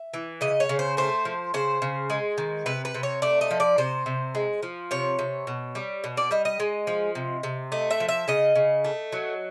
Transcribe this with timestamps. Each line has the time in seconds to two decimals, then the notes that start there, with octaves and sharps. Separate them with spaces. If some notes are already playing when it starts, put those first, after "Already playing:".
Already playing: E5
0.14 E3
0.41 C#3 D#5
0.60 C#5
0.69 C#3
0.79 C5
0.97 A3 C5
1.25 F3
1.54 C#3 C5
1.82 C#3
2.10 G#3
2.38 D#3
2.66 C3 B4
2.85 B4
2.94 C3
3.03 C#5
3.22 A3 D5
3.41 D#5
3.51 F3
3.60 D5
3.78 C3 C5
4.06 C3
4.35 G#3
4.63 F3
4.91 C3 C#5
5.19 C3
5.47 B2
5.75 G3
6.04 B2
6.17 D5
6.31 G3 D#5
6.45 D#5
6.60 G#3
6.87 F3
7.15 C3
7.43 C3
7.72 A3 D#5
7.91 E5
8.00 F3
8.08 E5
8.28 C#3 D#5
8.56 C#3
8.85 A3
9.12 F#3